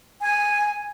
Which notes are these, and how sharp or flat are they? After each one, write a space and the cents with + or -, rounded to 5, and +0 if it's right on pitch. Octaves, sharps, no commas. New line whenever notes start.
G#5 -5